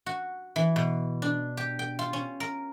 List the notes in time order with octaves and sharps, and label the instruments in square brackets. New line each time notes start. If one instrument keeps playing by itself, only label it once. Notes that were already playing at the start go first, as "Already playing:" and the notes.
[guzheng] F#4
E3
B2
D4
G4
G5
F4
C#4
A#4